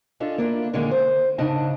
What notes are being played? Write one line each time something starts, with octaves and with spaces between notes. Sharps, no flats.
C#4 D4 F4 A4 D#5
A#3 D4 E4 F4
A#2 D3 D#3 G#3 A#3 C#4
C5
G#2 C#3 D4 D#4 D#5 A5